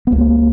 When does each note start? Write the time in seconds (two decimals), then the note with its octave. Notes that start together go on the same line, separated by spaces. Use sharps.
0.07 B3
0.12 C#2 A#3